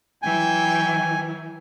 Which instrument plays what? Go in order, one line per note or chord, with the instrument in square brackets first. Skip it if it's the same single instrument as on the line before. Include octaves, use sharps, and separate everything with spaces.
[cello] E3 F#3 [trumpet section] G5 [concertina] G#5